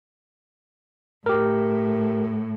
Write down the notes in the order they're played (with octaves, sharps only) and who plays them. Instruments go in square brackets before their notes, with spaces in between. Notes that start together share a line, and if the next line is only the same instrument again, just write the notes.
[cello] A2 [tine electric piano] G4 A#4